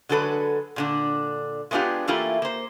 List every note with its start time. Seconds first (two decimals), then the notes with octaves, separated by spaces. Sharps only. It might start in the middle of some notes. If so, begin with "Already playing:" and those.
0.09 D3 F#3 G#3 A4 B4
0.76 A#2 D3 D4
1.71 G#3 A3 B3 D4 F4 G4
2.07 E3 A3 A#3 E4 F4 G4
2.42 A#3 C5